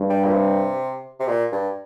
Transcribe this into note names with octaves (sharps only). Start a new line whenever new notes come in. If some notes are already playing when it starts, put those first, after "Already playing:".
Already playing: G2
G3
A#2
C3
C3
A#2
G2